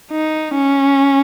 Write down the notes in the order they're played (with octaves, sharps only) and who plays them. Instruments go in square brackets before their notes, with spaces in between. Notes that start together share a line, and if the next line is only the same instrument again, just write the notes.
[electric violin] D#4
C#4